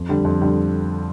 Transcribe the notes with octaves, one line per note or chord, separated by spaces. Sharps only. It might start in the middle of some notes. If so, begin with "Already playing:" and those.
Already playing: F2
D3 G3
F2
D3 G3